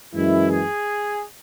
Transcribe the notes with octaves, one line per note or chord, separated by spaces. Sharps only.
F#2 E3 G#3 E4
G#4